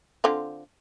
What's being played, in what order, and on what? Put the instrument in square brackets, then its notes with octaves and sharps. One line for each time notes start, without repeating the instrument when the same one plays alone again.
[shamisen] D3 C4 F4